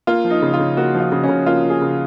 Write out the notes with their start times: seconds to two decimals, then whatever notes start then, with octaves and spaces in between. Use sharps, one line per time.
0.07 A#3 F4
0.25 F3
0.30 D#4
0.42 C#3
0.54 F4
0.59 C#3
0.77 A#3 F#4
0.95 F3
1.00 F4
1.12 C#3
1.23 C#4
1.29 C#3
1.46 A#3 F4
1.64 F3
1.70 G#4
1.81 C#3